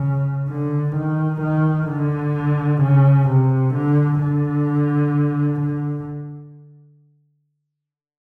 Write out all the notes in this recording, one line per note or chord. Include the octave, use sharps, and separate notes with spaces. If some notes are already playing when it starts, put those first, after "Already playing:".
Already playing: C#3
D3
D#3
D#3
D3
C#3
C3
D3
D3
D3